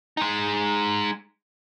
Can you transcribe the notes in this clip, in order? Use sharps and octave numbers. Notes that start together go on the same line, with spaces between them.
G#3 D#4